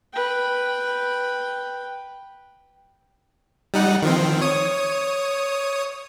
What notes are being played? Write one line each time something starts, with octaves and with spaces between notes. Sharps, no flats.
B4 G5
G3 D#4 F#5
D#3 F3 C4
C#5 D#6